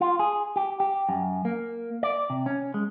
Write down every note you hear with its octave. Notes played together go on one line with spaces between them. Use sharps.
F4
G#4
G4
G4
F#2
A#3
D5
C3
C#4
G#3